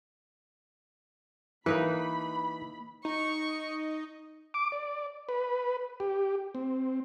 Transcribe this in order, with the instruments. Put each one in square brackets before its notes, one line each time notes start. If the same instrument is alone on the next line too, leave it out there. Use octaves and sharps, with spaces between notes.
[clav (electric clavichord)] E3 [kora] A#3 D#4 B4 [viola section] B5
[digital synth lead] D#4 [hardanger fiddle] C#6
[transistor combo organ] D6
D5
B4
G4
C4